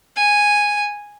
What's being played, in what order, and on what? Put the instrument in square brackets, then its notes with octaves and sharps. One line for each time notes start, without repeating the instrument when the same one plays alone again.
[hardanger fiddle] G#5